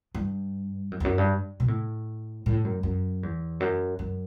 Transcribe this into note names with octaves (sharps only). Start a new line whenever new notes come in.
G2
F#2
E2
F#2
G2
B2
A2
A2
F#2
F#2
E2
F#2
F#2